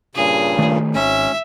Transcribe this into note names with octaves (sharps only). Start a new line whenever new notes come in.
G2 A#2 C#3 G#4
D#3 A3
G#1 C#4 E5